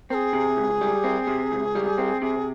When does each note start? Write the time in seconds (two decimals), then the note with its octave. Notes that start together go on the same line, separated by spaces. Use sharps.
0.10 C4 G#4 A#4
0.33 C3
0.57 C#2
0.81 G3
1.04 C4
1.27 C3
1.52 C#2
1.75 G3
1.98 C4
2.22 C3 G#4